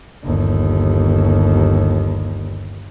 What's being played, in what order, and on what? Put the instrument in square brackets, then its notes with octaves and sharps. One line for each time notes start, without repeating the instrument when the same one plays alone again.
[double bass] G1 D#2